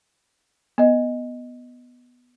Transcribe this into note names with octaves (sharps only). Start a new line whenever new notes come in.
B3 D#5